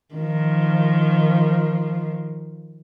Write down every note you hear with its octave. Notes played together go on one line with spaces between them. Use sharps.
D#3 F3